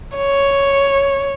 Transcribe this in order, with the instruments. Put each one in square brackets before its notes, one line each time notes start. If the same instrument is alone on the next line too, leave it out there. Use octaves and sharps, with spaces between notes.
[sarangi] C#5